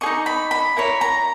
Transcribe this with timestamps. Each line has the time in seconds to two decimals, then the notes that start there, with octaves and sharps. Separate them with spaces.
0.01 G#4 D#5 C#6
0.06 D#4
0.26 B5
0.51 B5
0.77 E4 A#4 C#5 B5
1.01 A#5